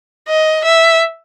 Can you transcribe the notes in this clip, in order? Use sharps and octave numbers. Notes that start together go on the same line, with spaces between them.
D#5
E5